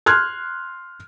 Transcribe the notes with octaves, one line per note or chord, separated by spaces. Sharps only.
C6 F6 F#6 G#6